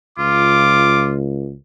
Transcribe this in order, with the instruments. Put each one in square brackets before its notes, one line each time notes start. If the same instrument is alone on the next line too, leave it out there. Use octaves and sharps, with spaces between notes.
[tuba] C#2 [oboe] F4 [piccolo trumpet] D6